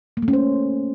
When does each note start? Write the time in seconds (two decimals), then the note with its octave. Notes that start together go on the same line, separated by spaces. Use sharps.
0.17 A#3
0.23 A3
0.28 C#4
0.33 C5